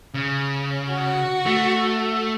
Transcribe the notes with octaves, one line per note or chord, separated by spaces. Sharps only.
C#3
F#4
A3